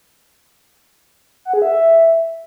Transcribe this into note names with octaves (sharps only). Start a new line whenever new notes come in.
F#5
G#4
E5